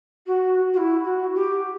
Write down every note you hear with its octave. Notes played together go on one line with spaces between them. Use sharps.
F#4
F#4
E4
F#4
G4